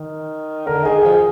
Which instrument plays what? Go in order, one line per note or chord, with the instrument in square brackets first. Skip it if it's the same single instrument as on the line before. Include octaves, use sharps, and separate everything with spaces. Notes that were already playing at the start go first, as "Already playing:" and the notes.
Already playing: [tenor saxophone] D#3
[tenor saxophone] D3 [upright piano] A#4
[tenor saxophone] D#3 [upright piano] G#4
[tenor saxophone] F3 [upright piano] G#4